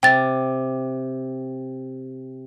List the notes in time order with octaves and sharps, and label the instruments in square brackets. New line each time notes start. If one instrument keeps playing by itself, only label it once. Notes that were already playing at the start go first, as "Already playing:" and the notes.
[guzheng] C3 [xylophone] G5 A6